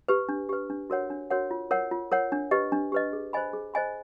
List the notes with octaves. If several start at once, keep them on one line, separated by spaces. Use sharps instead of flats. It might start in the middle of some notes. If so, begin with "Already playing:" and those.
G4 B4
D4
G4 B4
D4
F#4 A#4 C#5 F#5
D4
F#4 A#4 C#5 F#5
F4
A#4 C#5 F#5
F4
A#4 C#5 F#5
D4
G4 B4 D#5
D4
G4 B4 D#5
G#4
C5 D#5 G#5 B5
G#4
C5 D#5 G#5 B5